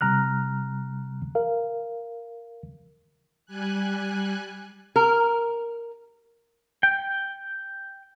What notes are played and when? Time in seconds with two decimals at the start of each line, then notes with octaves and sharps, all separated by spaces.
0.01 C3 G3 A#5 F6 F#6
1.35 A#4 F5
3.46 G3 G#5 F#6
4.96 A#4
6.83 G5